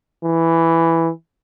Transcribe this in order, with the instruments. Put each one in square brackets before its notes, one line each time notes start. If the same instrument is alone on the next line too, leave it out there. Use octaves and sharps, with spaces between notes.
[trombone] E3